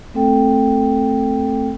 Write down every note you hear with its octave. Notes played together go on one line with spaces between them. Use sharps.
A3 C4 A4 G5